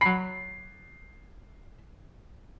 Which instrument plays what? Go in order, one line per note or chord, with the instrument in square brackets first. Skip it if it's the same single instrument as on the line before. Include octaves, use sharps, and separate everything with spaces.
[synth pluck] F#3 B5 [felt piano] C7